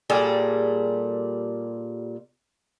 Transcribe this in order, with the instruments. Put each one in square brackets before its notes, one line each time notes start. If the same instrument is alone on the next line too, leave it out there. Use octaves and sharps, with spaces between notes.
[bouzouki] A#2 G3 G#4 A4